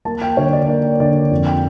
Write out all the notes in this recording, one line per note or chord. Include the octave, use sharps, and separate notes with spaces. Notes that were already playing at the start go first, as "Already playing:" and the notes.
A#3 A5
G5
D3 C#5
D5
A#3 D5
D3 D5
F2
G5